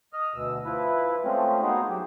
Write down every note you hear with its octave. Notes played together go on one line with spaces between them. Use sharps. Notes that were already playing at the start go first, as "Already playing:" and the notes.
D#5 F6
D2 B2 E6
F3 E4 B4
F3 G#3 A3 C4 C#4 F4
B3 D#4 F#4 G#4 A#4 C5
F#3 G4